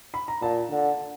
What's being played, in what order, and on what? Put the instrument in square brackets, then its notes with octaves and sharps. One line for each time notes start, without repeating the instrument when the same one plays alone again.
[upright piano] B5
A#5
[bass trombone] A#2 [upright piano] A5
[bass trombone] D3